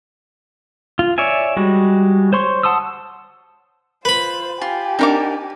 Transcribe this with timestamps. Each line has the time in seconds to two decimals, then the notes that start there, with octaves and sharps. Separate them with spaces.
0.99 F4
1.18 C#5 D5 E5 G#5
1.57 G3 G#3 F#4
2.33 C5 C#5 C6 C#6
2.63 F#5 A5 C6 D#6 E6
4.05 F4 B4 C5 B5
4.62 F4 G4 G#5
4.99 C4 D4 D#4 A#4 F#5 D6